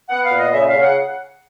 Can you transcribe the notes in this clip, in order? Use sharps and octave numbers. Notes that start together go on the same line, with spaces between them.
B3 F#5
F5
A#2
D#5
C#3 E5
F5
C#3
F#5